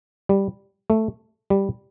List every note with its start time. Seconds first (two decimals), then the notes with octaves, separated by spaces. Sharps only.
0.29 G3
0.90 A3
1.50 G3